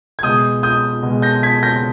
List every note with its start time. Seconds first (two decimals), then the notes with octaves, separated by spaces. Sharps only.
0.19 G#6
0.23 B2 G#3 D#6 G6
0.63 D#6 G6
1.03 B2 G#3
1.22 G6 A#6
1.43 G#6 B6
1.63 G6 A#6